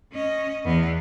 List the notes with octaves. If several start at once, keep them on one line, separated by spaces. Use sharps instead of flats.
C#4 D#5
E2 B3